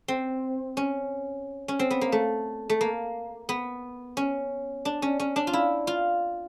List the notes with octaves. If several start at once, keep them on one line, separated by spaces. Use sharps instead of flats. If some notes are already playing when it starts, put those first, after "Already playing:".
C4
C#4
C#4
C4
B3
A#3
A3
A3
A#3
B3
C#4
D4
C#4
C#4
D4
F4
E4
F4